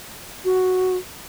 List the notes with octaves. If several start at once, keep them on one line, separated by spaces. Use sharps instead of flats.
F#4